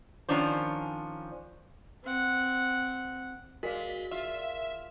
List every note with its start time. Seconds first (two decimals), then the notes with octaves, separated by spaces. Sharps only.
0.29 D#3 F3 C#4 D4 C5
2.04 C4 F#5
3.63 G#3 F#4 A#4 D5 F5 B6
4.11 F4 E5